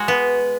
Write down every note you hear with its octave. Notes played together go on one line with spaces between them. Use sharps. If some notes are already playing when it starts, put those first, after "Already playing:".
Already playing: G#3 F#4
B3